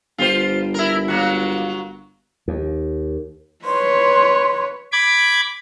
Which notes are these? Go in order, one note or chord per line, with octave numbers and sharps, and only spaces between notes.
G1 F4 G4 C5
E4 A#4
F#3 A#3 F#4
D#2
B4 C#5 C6
B5 D6 G#6